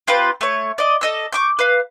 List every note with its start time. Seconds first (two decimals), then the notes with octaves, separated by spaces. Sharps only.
0.07 C4 F4 G4 B4
0.41 A3 C#5
0.78 D5 D#5
1.01 A4 D#5 E6
1.32 C#6 D6 G6
1.59 B4 F5